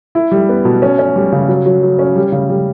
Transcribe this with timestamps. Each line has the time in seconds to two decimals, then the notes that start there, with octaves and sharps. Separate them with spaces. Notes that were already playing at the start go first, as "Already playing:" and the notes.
0.15 E4
0.32 G3
0.49 B3
0.65 B2
0.82 C#4
0.99 C#4
1.16 G3
1.32 C#3
1.49 F#3
1.66 F#3
1.83 F#3
1.99 C#4
2.16 G3
2.32 C#3
2.49 G3